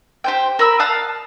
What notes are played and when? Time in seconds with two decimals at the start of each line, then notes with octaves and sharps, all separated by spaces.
0.24 G4 C5 G5
0.59 A#4 B5 E6
0.80 F5 A5 D#6 F#6